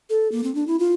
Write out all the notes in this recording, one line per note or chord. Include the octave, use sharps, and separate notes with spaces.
A4
A#3
C4
D4
E4
F4